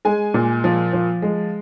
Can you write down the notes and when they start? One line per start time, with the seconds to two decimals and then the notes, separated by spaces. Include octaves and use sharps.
0.05 G#3 G#5
0.34 A#2
0.64 F3
0.93 F3
1.22 G#3